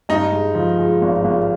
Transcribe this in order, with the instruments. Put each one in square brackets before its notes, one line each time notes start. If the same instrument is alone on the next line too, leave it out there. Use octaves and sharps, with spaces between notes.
[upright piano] G2 [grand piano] D#4
[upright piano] G#3
F3
G#3
G#1
G#1